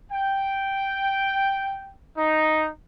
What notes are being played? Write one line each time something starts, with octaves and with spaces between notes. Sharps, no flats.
G5
D#4